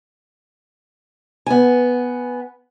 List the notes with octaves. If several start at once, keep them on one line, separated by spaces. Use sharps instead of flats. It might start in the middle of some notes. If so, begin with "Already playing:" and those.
B3 G#5